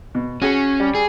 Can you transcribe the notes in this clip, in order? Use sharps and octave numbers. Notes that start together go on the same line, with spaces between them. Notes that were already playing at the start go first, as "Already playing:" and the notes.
B2
C#4 F#4 G#4 G#5
G3
G#4